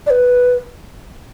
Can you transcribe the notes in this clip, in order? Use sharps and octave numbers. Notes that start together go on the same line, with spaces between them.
D5
B4